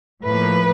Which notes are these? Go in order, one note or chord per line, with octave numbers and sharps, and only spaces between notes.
A2 F3 A#3 B4